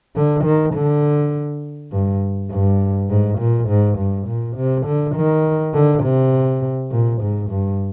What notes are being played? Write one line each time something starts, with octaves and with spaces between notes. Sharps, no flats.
D3
D#3
D3
G2
G2
G#2
A#2
G#2
G2
A#2
C3
D3
D#3
D3
C3
A#2
G#2
G2